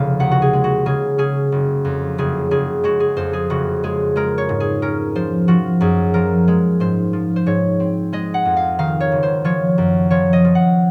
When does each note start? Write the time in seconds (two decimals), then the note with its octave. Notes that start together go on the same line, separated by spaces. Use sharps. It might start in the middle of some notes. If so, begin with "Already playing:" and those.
Already playing: F1 C#3 F5
0.20 D#2 F#5
0.31 F#4
0.42 G#4
0.53 G#3
0.64 F#4
0.86 C#3 G#4
1.18 C#4 G#4
1.52 F#1
1.85 F2
2.18 F#1 G#4
2.51 F#1 G#4
2.84 G#3 F#4
3.00 G#4
3.17 F2 C5
3.33 G#4
3.50 F#1 F#4
3.83 G#3 G#4
4.16 G#3 A#4
4.38 C#5
4.49 G#2
4.60 G#4
4.82 C#4 A#4
5.15 F3 C5
5.48 F3 F#4
5.81 F#2 G#4
6.14 F3 A#4
6.48 G#3
6.80 G#2 C5
7.13 F3
7.36 C5
7.46 G#2 C#5
7.80 C4
8.13 G#3 D#5
8.34 F#5
8.45 F2
8.57 F5
8.79 D#3 F5
9.00 C#5
9.12 F#1
9.23 C5
9.45 F3 C#5
9.78 F#2
10.11 F3 C#5
10.33 D#5
10.45 F3
10.55 F#5